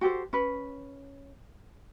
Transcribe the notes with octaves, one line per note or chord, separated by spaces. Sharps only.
F#4 G4 A4 C5
C#4 B4